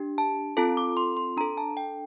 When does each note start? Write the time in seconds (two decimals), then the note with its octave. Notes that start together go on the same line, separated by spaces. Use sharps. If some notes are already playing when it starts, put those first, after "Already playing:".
Already playing: D4 G4
0.18 A5
0.57 C4 F4 A4 A5
0.77 D6
0.97 C6
1.17 C6
1.37 D4 A#5
1.41 A4
1.57 A5
1.77 G5